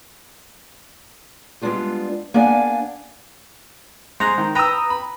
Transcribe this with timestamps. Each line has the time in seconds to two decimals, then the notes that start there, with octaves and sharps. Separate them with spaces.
1.61 G3 G#3 B3 D4 F4 G4
2.34 A#3 B3 D4 D5 F5 G#5
4.20 G#3 C5 A#5 F#6
4.38 D#3
4.55 B4 G5 A#5 D#6 E6
4.90 B5